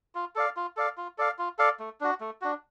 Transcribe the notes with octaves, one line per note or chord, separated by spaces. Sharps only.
F4
A4 D5 F5
F4
A4 D5 F5
F4
A4 D5 F5
F4
A4 D5 F5
A3
D4 F#4
A3
D4 F#4